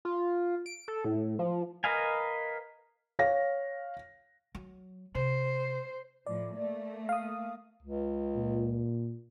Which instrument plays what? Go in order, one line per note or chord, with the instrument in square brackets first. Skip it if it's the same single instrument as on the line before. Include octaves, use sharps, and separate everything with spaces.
[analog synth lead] F4
D7
A4
A2
F3
[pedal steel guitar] A#4 B4 D#5 F5 G#5
[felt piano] C#5 F5 A#6
[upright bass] F#3
[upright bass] C3 [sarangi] C5
[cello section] A2 F3 [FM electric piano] D5
[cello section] A3 A#3
[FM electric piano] F5 D#6
[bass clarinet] C#2
[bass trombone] A#2